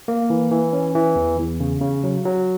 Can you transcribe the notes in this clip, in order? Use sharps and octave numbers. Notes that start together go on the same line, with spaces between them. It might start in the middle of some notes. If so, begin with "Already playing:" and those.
A#3
E3
E3
C#4
E3
E2
E2
C#3
C#3
F#3
F#3